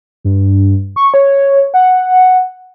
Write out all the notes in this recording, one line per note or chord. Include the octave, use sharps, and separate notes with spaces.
G2
C#6
C#5
F#5